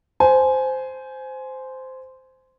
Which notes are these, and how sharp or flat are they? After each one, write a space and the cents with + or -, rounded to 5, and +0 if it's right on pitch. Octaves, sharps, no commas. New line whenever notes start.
C5 -10 G#5 +15